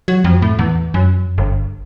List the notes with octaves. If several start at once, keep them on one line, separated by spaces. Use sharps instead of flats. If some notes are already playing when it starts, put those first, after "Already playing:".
F#3
F2
A2
E2
F#2
G1